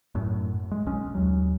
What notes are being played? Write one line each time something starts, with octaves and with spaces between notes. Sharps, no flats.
F#2 A2
G#3
B1 G#3 C#4
D#2 F#3